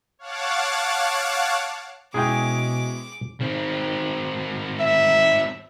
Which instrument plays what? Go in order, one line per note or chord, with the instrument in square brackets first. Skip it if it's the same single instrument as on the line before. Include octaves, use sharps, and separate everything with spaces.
[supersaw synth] C#5 F5 F#5 A5 D6
[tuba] B2 [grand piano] G#3 C#4 E4 [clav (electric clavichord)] G#4 G5 [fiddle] D6
[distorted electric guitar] D#3 C4
[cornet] E5